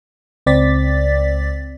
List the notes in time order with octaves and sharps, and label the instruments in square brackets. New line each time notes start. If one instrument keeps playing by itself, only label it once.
[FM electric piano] C#2 C4 D5 A6 B6